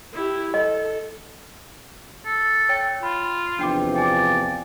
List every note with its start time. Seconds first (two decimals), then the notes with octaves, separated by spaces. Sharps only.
0.14 E4 G4
0.54 A4 D#5
2.25 A4
2.69 C#5 G5
3.03 F4 B5
3.59 E2 C3 F3 D4 G5 D6
3.96 D5 G5 G#5